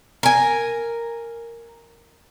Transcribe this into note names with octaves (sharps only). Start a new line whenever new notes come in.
A#4 G#5